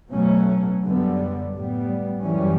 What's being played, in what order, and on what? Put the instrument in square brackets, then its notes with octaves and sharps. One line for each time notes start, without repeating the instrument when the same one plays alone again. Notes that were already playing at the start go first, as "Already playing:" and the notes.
[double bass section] B2 F#3 A3 C#4
F#2 D3 G3 B3
A2 G3 B3
F#2 E3 G3 C#4